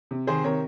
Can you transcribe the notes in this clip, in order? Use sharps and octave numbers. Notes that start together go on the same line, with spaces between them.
C3
D#3 G#4 C5
C3 A#4 C#5